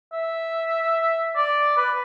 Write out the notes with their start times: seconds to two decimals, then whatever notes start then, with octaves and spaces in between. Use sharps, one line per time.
0.13 E5
1.36 D5
1.77 B4